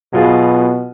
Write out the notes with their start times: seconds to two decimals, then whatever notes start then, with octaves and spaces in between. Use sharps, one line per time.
0.13 B2 F#3 B3 F4 G#4